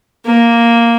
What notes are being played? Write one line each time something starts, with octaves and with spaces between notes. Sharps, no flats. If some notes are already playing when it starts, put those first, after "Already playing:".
A#3